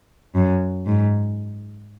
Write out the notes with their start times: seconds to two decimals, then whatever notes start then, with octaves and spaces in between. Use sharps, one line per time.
0.34 F#2
0.86 G#2